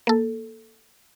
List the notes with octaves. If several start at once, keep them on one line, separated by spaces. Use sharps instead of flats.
A#3 A4